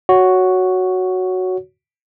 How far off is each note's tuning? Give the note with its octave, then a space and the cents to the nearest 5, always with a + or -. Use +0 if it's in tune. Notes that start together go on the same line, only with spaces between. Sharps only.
F#4 +0 C#5 +10